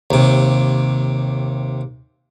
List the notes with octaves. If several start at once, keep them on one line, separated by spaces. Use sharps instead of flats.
D#2 C3